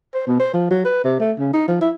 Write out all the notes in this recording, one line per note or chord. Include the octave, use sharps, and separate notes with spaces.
C5
B2
C5
F3
F#3
B4
C3
A3
C#3
D#4
F3
E4